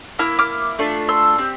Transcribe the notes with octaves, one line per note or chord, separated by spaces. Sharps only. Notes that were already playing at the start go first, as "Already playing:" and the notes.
A#3 E4 F6
D6 F6
A3 D4 F4
C6 E6
C4 G4